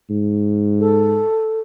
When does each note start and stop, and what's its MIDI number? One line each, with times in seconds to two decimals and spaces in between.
0.10 1.22 44
0.79 1.60 69